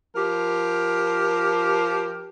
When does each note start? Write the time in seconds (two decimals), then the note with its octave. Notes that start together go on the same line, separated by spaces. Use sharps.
0.15 F3 G4 A#4